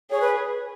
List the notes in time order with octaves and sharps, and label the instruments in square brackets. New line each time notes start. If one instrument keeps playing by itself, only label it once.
[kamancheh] G#4 [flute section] C#5
[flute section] B4